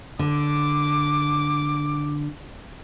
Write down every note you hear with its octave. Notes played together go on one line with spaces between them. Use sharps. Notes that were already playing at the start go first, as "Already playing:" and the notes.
D3 D6